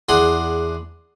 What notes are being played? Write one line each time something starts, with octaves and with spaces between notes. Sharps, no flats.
E2 D4 G#4 F#5 C6